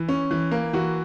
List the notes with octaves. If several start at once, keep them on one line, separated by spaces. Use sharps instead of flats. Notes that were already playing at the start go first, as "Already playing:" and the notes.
Already playing: E3
C#4
E3
A#3
E3 F#4